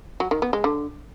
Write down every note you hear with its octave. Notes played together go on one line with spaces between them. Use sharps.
F#3
D#3
B3
G#3
D3